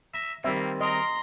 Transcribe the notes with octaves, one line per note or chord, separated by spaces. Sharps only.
E5 A#5
D#3 G3 A#3 C4 E5
A#4 D#5 A#5 C6